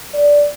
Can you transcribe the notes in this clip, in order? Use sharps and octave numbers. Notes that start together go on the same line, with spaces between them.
D5